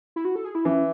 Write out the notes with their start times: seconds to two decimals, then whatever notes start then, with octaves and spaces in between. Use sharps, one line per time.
0.16 E4
0.25 F#4
0.36 A4
0.45 G#4
0.55 E4
0.65 E3 C#4